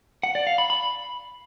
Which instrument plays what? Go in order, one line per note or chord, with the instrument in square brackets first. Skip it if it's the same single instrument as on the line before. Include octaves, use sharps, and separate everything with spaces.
[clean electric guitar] F#5
D5
F5
B5
B5